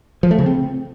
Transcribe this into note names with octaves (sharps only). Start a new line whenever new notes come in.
F3
A3
C#3
C4